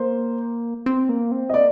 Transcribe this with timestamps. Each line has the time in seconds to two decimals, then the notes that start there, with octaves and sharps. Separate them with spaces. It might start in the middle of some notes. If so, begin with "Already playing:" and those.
Already playing: A#3 C5
0.86 C4
1.09 A#3
1.32 C4
1.49 D#5
1.54 A#3 D5